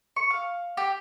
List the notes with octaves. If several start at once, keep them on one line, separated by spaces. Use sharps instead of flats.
C#6
F5
G4